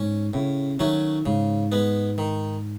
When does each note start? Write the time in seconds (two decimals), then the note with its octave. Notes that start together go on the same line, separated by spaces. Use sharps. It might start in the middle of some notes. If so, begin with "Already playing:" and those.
Already playing: G#2 C#4
0.33 A2 C#3
0.79 D#3 F#3 A3 C#4
1.26 G#2 C#3
1.72 G#3 B3
2.18 D#3